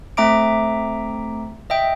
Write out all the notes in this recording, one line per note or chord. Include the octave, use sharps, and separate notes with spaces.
A3 C4 E5 A#5 D6 D7
D#5 E5 G5